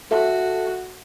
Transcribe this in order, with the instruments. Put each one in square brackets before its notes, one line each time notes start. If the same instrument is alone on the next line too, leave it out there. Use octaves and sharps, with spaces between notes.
[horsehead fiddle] F#4 [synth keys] A4 E5 A5